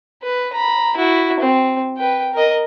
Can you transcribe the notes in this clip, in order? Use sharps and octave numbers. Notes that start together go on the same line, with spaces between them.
B4
A#5 B5
E4 F#4
C4
B4 G5
A#4 D#5